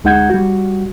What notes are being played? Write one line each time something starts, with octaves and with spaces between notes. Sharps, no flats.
D2 G#3 D#4 F#5 G6 G#6
G3 F#4